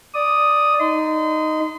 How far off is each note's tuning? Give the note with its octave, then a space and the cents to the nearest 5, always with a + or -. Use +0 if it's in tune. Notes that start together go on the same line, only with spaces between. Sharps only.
D5 +0 D#6 +0
D#4 +0 C6 -35